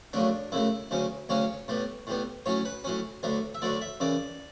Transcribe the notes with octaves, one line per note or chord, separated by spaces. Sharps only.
F#2 C#3 F#3 A3 D4
F#2 C#3 F#3 A3 E4
D2 C#3 F#3 C#4
D2 C#3 F#3 C#4 C#5
A2 G3 B3
A2 G3 B3
A2 F#3 C#4 C#5
B4
A2 F#3 C#4
D2 D3 F#3 A3
E5
D2 D3 F#3 A3 D5
E5
F#2 C#3 E3 D5